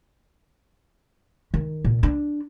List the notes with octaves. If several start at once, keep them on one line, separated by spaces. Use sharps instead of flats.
D#3
A#2
D4